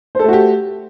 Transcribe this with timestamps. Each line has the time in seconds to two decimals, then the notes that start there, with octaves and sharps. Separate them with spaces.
0.15 C5
0.19 A4
0.24 A3
0.28 F#4
0.33 G4